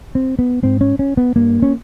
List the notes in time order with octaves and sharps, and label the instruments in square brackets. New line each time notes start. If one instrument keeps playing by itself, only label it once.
[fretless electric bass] C4
B3
G#2 C4
C#4
C#4
B3
G2 A#3
C#4